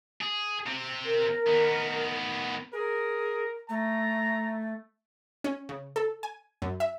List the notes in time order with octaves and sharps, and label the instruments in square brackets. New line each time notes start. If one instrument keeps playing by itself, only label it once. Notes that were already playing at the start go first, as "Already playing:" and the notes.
[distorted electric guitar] G#4
C3 C4
[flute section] A#4
[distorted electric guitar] D#3 B3
[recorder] G#4 [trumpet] A#4
[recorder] A3 [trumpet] A#5
[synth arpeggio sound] C#4
C#3
A4
G#5
F#2
E5